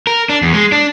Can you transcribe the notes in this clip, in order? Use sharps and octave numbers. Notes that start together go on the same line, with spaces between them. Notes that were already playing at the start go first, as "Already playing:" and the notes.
A#4
D4
E2
G#3
D4